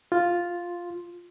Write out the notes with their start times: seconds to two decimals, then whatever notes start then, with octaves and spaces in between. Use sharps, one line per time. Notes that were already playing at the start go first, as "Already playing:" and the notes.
0.12 F4